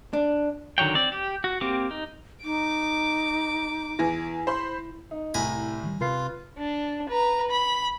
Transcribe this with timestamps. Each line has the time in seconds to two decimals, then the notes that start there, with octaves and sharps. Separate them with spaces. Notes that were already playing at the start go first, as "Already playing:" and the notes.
0.13 D4
0.78 D3 D#3 F#3 C#5 G5
0.95 C4 D5
1.12 G4
1.44 F#4
1.61 A#3 C4 G4 D6
1.91 D#4
2.44 D#4 D6
3.99 E2 E4 G#5 A#6
4.47 C5 B5 C6
5.11 D#4
5.34 C2 A2 G#5 A#5 B5
5.83 D#3 G3
6.01 C3 F4 B4 C7
6.58 D4
7.09 B4 A#5
7.50 B5